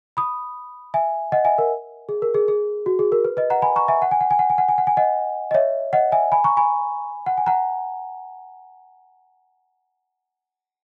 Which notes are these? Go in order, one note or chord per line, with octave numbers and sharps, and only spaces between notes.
B5 D#6
E5 G#5
D#5 F#5
E5 G#5
A#4
G#4
A#4
G#4
G#4
F#4
G#4
A#4
B4
B4 D#5
F#5 A#5
G#5 B5
A#5 C#6
E5 G#5
F#5
G#5
F#5
G#5
F#5
G#5
F#5
G#5
F#5
G#5
D#5 F#5
D#5
C#5 E5
D#5 F#5
E5 G#5
G#5 B5
A#5 C#6
G#5 B5
F#5
G#5
F#5 A#5